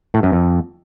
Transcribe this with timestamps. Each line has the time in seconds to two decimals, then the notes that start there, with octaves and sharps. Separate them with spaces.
0.14 A2
0.23 F#2
0.32 F2